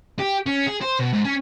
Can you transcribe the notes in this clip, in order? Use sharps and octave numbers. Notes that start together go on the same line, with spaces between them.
G4
C#4
G#4
C5
B2
G#2
C#4